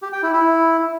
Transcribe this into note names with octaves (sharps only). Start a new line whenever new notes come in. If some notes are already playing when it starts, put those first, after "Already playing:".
G4
G5
E4
E4